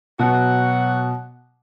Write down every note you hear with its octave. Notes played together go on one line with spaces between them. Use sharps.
B2 F#3 F#4 F#5